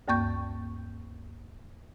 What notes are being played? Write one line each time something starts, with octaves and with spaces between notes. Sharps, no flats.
D2 G2 A#3 C#6 G6